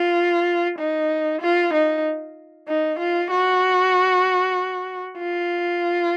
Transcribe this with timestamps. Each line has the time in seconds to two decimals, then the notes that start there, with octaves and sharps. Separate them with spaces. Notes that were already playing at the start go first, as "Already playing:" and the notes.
Already playing: F4
0.79 D#4
1.42 F4
1.74 D#4
2.68 D#4
2.99 F4
3.31 F#4
5.19 F4